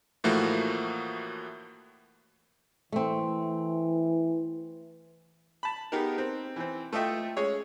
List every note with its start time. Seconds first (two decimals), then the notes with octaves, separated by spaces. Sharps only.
0.24 A2 E3 F3 A3 A#3 F#4
2.92 E3 A3 C4
5.63 A5 B5
5.92 B3 D#4 G4 G#4 A#4
6.18 C4
6.56 E3 C4
6.93 A3 F4 A4 D#5 E5 G5
7.37 G#3 C#4 G#4 C#5